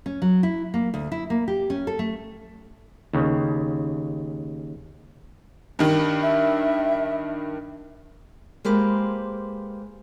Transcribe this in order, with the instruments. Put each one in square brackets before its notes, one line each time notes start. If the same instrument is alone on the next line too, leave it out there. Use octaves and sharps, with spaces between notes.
[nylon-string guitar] C#4
F#3
E4
A#3
D2
E4
A#3
G4
C#4
A4
A3
[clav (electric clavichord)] D#2 C#3
[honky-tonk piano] G2 D#3
[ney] E5
[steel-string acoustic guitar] G#3 A#3 G4 B4 C5